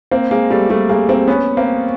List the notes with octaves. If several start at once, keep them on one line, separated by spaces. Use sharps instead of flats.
A#3 C4
G#3 A#3
G3 A3
G3 A3
G#3 A#3
A#3 C4
B3 C#4
A#3 C4